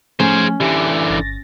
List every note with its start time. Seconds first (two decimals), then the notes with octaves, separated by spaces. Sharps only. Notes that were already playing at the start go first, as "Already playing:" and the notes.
0.20 F3 A3 C#4 G#4 C5
0.60 D3 E3 G4 D6
1.10 G1 A6 A#6